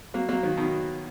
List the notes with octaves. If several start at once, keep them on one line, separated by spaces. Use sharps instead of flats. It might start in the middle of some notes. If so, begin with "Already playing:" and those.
F#3 A#3
F#3 A#3
D#3 F#3
B2 D#3